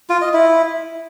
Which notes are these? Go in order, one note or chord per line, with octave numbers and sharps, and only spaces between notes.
F4
D#5
E4